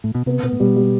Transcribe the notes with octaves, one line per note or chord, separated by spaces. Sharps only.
A2
B2
C3 B3
B2 B3
A2
B2 G3
G3